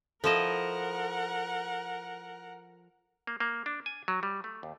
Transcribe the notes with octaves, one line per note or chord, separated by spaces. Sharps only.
F3 E4 A4 A#4 D#5 F#5 E7
A#3
A#3
D4
G#5
F#3
G3
A3
D#2